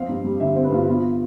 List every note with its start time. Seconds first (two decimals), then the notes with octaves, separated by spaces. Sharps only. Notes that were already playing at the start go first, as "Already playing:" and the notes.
Already playing: F2 C4 F5
0.09 G2
0.24 G3
0.40 D3 E5
0.53 C4 C5
0.64 B4
0.72 G2 F4
0.88 B3 F4